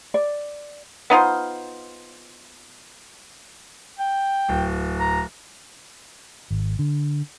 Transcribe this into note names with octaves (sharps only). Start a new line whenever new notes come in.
D5
B3 D#4 F4 C5
G5
D1
A#5
G#1
D3